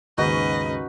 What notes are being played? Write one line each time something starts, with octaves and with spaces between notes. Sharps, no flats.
D#2 G#2 C#3 C#4 D#4 F#4 B4 D#5